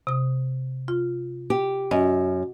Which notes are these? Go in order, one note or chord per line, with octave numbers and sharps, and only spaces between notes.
C3 D#6
F4
G4
F#2 D#5